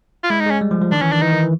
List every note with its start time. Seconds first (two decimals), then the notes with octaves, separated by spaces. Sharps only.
0.23 F4
0.30 G#3 E4
0.40 D#4
0.46 G#3 C#4
0.61 G3
0.71 F3
0.81 F3
0.91 D#3 D4
1.02 E3 C#4
1.11 D#3 D4
1.21 E3 D#4
1.32 D#3
1.42 E3